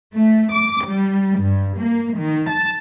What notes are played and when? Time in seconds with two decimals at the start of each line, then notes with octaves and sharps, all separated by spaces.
0.15 A3
0.55 D6
0.86 G3
1.41 G2
1.80 A#3
2.19 D#3
2.50 A5